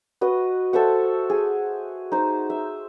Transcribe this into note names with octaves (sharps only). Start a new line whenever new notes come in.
F#4 B4 D#5
A4 C5 E5 F#5
G#4
D#4 C5
E5